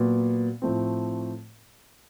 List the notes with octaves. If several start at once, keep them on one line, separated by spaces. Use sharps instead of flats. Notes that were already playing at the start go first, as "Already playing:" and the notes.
Already playing: A#2 F#3 B3
A2 F3 A3 C4